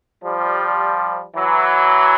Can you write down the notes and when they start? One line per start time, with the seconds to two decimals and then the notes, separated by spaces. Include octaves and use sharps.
0.23 F3 G3
1.35 E3 F#3